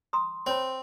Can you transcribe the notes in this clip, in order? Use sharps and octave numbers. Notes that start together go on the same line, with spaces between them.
A#5 C6 D#6
C4 C5 C#5 B5